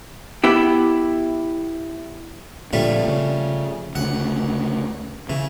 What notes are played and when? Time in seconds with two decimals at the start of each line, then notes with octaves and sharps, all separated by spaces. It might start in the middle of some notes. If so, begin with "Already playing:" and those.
0.44 B3 E4 G4
2.73 A#2 D3 F3 G3 A3
3.08 C#3
3.96 D2 C#3 F#5
5.30 C#3 E3